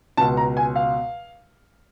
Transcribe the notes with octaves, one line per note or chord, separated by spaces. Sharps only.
C#2 B2 A5
A#5
G#5
F5